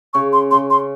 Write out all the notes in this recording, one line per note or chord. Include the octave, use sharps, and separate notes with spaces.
C#3 C#6
C6
C#3 C6
C6